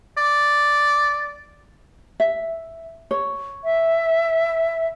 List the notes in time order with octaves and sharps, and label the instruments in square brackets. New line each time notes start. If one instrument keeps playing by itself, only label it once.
[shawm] D5
[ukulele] E5
C#5
[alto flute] E5